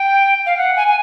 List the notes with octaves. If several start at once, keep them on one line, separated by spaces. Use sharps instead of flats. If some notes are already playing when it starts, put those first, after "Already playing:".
Already playing: G5
F5
F#5
G#5
G#5